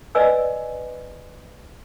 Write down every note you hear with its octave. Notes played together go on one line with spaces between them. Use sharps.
B4 D5 D#5 G#5 E6